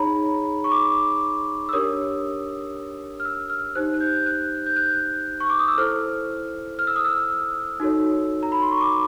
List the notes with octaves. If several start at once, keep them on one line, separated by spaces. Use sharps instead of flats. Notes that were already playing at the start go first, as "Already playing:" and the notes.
Already playing: D#4 G#4 C#5 A#5 B5
C#6
D6
E6
D4 G4 A#4 C#5 D#6
F6
E6
F6
D#4 G4 C5 F#6
F#6
G6
F#6
G6
F#6
C#6
D6
D#6
E6
E4 A4 C5 F6
F6
E6
D#6
E6
D#4 F#4 A4 C#5
A#5
B5
C6
C#6
D6